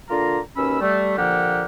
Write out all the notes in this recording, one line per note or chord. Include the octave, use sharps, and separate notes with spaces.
D3 A#3 F4 A#5
D#2 B2 C#4 B5 E6
G3 A3
A#2 D3 F3 A#3 G4 F#5